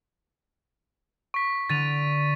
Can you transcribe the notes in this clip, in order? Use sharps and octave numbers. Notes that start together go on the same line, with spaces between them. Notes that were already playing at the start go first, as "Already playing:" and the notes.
C#6 B6
D3 A6 D#7 F7